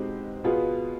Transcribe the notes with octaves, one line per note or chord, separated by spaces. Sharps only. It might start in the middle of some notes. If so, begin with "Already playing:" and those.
Already playing: B2 G#3 C4 D#4 G4
B2 B3 F4 G#4